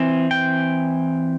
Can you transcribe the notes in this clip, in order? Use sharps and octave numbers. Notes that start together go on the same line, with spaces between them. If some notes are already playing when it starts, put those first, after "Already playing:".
Already playing: E3 C4
G5